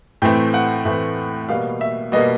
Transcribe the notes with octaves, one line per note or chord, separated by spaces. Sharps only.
A2 E3 A3 C4 G5
F#5
A2 E3 A3 C4 E5
B2 G3 A#3 F5
E5
B2 G3 A#3 D#5